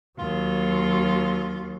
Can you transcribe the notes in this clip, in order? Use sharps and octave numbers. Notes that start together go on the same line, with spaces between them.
D#2 F#3 F4